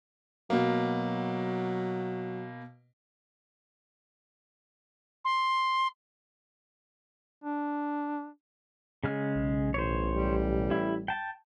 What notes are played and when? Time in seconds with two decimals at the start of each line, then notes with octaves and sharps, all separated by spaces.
0.50 B2 F#3 A#3
5.24 C6
7.44 D4
9.04 C#3 G#3 F6
9.36 B1
9.74 A1 C5 C#5
10.12 G3
10.71 E4
11.08 G5 A5